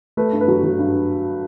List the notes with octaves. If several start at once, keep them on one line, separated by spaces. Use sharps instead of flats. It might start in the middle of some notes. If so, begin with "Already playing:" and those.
A3 B4
G2
B4
F#3
F#3
G2